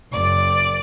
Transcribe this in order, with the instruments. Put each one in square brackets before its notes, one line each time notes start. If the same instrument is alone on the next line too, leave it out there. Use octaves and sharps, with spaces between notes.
[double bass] F#1 [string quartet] D5